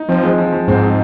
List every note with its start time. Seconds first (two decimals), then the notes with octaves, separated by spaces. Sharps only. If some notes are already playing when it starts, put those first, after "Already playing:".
Already playing: D#4
0.09 F3 C4
0.24 G#3
0.38 F3
0.52 F3
0.68 G#2 C4
0.83 D#4